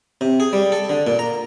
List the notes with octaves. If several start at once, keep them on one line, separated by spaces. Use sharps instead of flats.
C3
G#4
G3
A4
D3
A#2
A#5